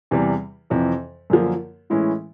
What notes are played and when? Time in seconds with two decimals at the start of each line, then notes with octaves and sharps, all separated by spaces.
0.11 E2 C3 E3 G3
0.70 F2 C3 E3
1.30 F#2 D3 F3 A#3
1.90 A2 E3 G#3 C#4 E4